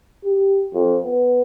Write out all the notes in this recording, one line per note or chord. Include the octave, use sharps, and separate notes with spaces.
G4
F2
B3